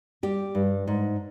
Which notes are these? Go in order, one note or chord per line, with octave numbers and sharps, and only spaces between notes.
G3 G4
G2
G#2